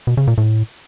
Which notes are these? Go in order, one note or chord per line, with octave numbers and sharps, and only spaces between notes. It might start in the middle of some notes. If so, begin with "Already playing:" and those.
B2
C#3
A#2
A2